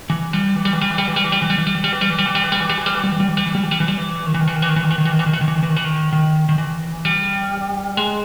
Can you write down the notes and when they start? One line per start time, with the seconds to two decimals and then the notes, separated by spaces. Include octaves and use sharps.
0.10 E3
0.33 G3
0.56 E3
0.65 G3
0.73 E3
0.81 G3
0.91 E3
0.98 G3
1.08 E3
1.16 G3
1.24 E3
1.32 G3
1.42 E3
1.50 G3
1.58 E3
1.67 G3
1.75 E3
1.84 G3
1.93 E3
2.01 G3
2.10 E3
2.19 G3
2.26 E3
2.35 G3
2.44 E3
2.52 G3
2.60 E3
2.69 G3
2.78 E3
2.86 G3
2.95 E3
3.04 G3
3.12 E3
3.20 G3
3.29 E3
3.37 G3
3.46 E3
3.55 G3
3.63 E3
3.71 G3
3.80 E3
3.88 G3
3.97 E3
4.26 D#3
4.34 E3
4.40 D#3
4.48 E3
4.56 D#3
4.62 E3
4.69 D#3
4.76 E3
4.84 D#3
4.91 E3
4.98 D#3
5.05 E3
5.12 D#3
5.19 E3
5.26 D#3
5.33 E3
5.41 D#3
5.48 E3
5.55 D#3
5.63 E3
5.69 D#3
5.76 E3
5.84 D#3
6.13 D#3
6.49 D#3
6.58 E3
7.05 G3
7.97 G#3